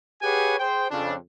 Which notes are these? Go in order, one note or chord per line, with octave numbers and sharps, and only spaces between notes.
G4 G#4 B4 C#5 F#5 G#5
G#4 C5 G5
F2 C#3 D4